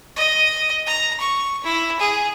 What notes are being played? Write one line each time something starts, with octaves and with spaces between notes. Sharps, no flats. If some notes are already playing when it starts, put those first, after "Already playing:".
D#5
A#5
C#6
E4
G#4